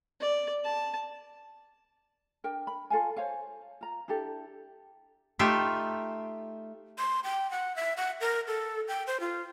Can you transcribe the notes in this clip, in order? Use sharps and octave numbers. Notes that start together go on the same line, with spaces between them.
D5
A5
D4 A#4 G5
B5
F4 A4 F5 G#5
C5 C#5 F5 G#5
F4 A#5
D4 E4 G4 A4
A3 D#4 F4 G4 E5
C6
G5
F#5
E5
F#5
A#4
A4
G5
C5
F4